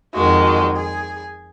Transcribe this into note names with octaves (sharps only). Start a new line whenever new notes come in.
F2 D#3 G#3 F#4
F#4
G#4